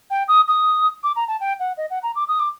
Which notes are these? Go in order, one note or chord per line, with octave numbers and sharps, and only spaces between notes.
G5
D#6
D#6
D6
A#5
A5
G5
F#5
D#5
F#5
A#5
D6
D#6
D6